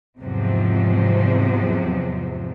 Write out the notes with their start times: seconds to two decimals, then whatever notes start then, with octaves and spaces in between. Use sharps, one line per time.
0.19 E2 G#2 C3 F3 F#3